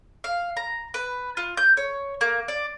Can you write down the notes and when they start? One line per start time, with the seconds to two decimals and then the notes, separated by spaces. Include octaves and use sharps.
0.24 F5
0.57 A#5
0.94 B4
1.37 F4
1.57 G6
1.77 C#5
2.21 A#3
2.48 D5